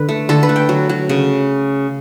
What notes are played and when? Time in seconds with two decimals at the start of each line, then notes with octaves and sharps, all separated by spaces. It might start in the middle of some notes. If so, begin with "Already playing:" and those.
Already playing: D3 B4
0.09 A3
0.29 D3 A4
0.43 B4
0.49 A3
0.56 G5
0.69 F#3
0.89 F#3
1.09 C#3